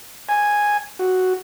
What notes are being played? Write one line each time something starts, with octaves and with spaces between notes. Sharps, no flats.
G#5
F#4